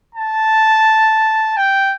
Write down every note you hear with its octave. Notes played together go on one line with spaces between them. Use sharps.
A5
G5